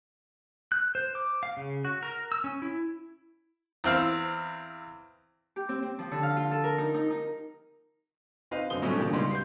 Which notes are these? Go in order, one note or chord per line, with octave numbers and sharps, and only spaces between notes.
F#6
C5
D6
F5
C#3
F#4
A#4
E6
C#4
E4
E2 C4 F5 E6
G4
C4
C4
F3
D3
F5
F4
A4
A#4
D#4
D#4
D#4
C4 D#4 B4 D#5 F5
F#2 D3 C4 D#6 G7
A2 F#3 G3 A3 C#4 D4
A#2 D3 E3 B3 G4 A#4
C#2 G3 B3 D#4 C6
G6 C7